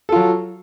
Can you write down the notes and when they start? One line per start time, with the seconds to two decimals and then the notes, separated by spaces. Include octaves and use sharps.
0.09 A4
0.12 F4
0.16 F#3